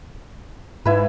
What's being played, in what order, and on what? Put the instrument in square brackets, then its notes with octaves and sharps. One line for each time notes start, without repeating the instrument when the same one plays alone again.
[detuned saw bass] G#2 [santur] E4 B4